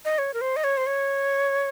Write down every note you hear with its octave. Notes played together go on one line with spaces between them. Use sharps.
D#5
C#5
A#4
C5
D#5
C#5
C5
C#5